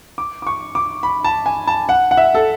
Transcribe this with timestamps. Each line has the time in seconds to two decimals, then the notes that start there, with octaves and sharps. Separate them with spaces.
0.18 D6
0.42 D6
0.47 C#6
0.75 D6
1.03 B5
1.24 A5
1.46 G#5
1.67 A5
1.89 F#5
2.11 F#5
2.17 E5
2.35 A4